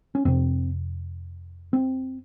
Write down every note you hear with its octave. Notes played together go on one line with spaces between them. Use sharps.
C#4
F2 C3 C4
C4